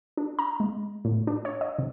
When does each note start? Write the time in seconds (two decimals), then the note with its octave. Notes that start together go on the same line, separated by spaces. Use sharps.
0.17 D4
0.39 A#5
0.60 G#3
1.05 A2
1.27 D4
1.45 C#5
1.61 D#5
1.78 C3